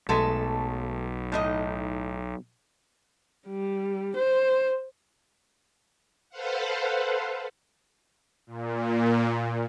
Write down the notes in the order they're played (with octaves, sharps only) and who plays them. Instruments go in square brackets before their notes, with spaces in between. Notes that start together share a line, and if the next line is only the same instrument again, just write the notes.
[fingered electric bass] B1 [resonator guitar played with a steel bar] G#3 A3 A4
[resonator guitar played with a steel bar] A2 D#4 D#5
[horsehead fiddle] G3
C5
[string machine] A4 B4 C5 F5 F#5
[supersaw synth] A#2